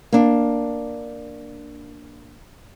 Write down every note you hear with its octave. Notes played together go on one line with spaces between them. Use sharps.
A#3 D4